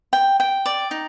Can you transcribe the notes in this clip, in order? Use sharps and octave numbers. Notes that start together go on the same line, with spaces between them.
G5
G5
D5
D#4